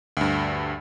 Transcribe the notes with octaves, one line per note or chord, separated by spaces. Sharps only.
D2 G2